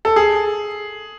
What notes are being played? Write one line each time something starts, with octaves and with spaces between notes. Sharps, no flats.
A4
G#4